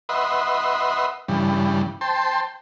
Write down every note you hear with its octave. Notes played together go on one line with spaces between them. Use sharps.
B4 D#5 E5 F#5 C6
G2 C#3 E3 G3
C5 G5 A5 C6